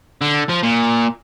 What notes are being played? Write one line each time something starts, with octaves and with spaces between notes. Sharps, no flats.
D3
F3
A#2